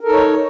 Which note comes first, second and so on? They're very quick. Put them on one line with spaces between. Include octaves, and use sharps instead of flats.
A#4 A4 D#4 C#5